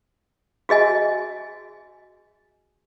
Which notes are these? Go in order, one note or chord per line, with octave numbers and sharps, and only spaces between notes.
F#4 G#4 D#5 G#5